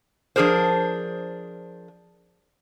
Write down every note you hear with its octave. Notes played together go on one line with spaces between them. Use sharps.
F3 D4 G#4 A#4 C5